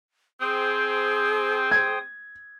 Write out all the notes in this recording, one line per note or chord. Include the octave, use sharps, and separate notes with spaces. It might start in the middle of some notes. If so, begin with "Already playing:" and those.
C4 G#4 C5 G5 D#6
G#6